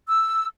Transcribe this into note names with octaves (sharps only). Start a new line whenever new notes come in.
E6